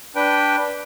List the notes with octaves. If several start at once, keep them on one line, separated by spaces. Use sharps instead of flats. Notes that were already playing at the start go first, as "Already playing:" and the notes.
D4 B4 G5